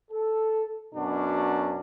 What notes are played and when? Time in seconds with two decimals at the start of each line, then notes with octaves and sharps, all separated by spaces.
0.11 A4
0.95 F#2 B2 D4 F#4